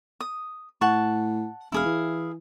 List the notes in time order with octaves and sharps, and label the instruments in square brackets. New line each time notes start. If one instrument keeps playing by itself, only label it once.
[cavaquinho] D#6
[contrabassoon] A2 [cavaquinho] F#5 A5 C#6
[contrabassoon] E1 [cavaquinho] E4 G#4 F5
[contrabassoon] E3